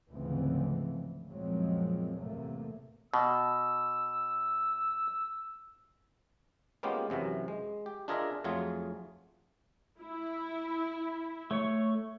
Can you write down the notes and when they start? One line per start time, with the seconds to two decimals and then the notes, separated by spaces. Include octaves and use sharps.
0.10 D2 G#2 C#3 E3 F3 C4
1.28 F#2 A#2 F3 F#3 G#3 C4
2.16 E2 A2 C3 A3 A#3
3.14 B2 E6
6.83 G#3 A#3 B3 C#4 F4 G4
7.10 F#2 C3 E3 F#3
7.48 G#3
7.86 G4
8.08 D4 F4 G#4 A#4 D#5 E5
8.44 F2 F#3 A3 F4 G#4
10.01 E4
11.51 A3 C#5 C#6